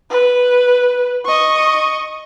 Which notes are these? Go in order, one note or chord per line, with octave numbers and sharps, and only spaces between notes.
B4
D#5 C#6